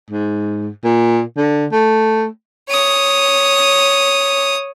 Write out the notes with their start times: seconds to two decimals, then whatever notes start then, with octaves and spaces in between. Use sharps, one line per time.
0.10 G#2
0.84 A#2
1.37 D3
1.72 A3
2.69 C#5 D#6